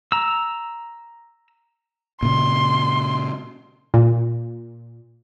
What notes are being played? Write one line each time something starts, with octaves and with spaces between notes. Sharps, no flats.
A#5 E6
A#2 C#3 C6
A#2